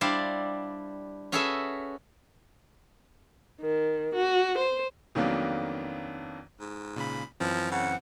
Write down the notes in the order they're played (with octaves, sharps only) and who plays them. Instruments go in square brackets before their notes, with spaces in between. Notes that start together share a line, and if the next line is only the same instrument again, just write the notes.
[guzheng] G3 D4 E4 C5 D5 F5
C#4 F#4 G#4 A4 B4 E5
[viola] D#3
F#4
C5
[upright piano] F2 D#3 F#3 A#3 B3 D4
[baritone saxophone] G#2
[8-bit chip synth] A#2 C#3 B5
[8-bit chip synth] F#2 E3 C4 [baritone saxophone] F3
[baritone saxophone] C#3 [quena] F#5